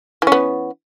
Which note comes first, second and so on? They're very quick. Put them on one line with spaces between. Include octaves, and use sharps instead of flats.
E3 C#4 B3